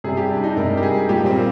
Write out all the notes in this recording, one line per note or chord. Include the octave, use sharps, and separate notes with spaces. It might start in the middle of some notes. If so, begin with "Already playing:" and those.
C3 G3 G#4
G4
D4
D#4
C3 G3 A#4
G4
G#4
A#2 G3 G4
C4
A#3